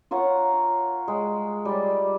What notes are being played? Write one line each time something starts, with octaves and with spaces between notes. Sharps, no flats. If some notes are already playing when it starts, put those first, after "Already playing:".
F4 A#4 C#5 F#5
G#3
G3 D5